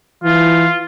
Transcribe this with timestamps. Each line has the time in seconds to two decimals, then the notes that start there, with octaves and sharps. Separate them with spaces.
0.24 E3 F4